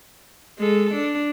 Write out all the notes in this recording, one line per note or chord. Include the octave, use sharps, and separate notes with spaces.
G#3 A4
D4